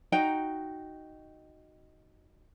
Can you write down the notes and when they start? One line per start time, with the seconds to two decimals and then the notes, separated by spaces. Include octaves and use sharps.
0.12 D#4 F#4 G5